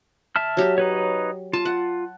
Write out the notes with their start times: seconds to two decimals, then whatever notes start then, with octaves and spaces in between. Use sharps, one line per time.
0.36 E5 A5 F6
0.57 F#3 G4
0.78 D#4 B4 C#5
1.53 F4 A5
1.65 F#5